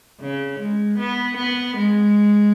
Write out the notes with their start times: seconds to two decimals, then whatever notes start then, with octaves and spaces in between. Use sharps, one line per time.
0.21 C#3
0.60 G#3
0.99 B3
1.38 B3
1.77 G#3